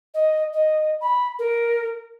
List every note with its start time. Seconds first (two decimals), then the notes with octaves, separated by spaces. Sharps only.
0.14 D#5
0.53 D#5
1.01 B5
1.39 A#4